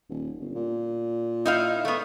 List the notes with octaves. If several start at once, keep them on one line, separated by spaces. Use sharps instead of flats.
D#1
G1
A#2
D#4 E4 F5
A3 B3